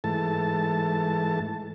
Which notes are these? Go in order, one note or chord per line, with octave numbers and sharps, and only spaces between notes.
G#2 E3 A3 A5